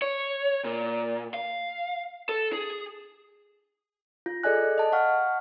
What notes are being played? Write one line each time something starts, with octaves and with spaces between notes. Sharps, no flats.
C#5
A#2
F5
A4
G#4
F4
G#4 A4 D5 D#5 G#5 F#6
D#5 A5
F5 F#5 C#6 F6